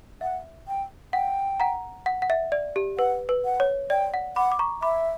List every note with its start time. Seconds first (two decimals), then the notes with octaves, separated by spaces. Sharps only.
0.21 E5 F#5
0.68 G5
1.13 F#5 G5
1.60 F#5 A#5
2.06 F#5
2.22 F#5
2.30 E5
2.52 D5
2.76 G4
2.98 B4 F#5
3.29 B4
3.45 F#5
3.60 C#5
3.90 D5 G5
4.14 F#5
4.36 F#5 B5 D6
4.52 D6
4.59 A#5 C#6
4.82 E5 B5 D6